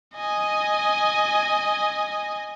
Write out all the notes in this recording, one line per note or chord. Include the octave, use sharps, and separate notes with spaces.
D#5 G#5